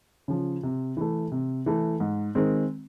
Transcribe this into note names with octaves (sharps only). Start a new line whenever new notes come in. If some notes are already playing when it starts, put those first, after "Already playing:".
C#3 F3
C3
E3 A3
C3
E3 A3
G#2
D#3 G#3 C4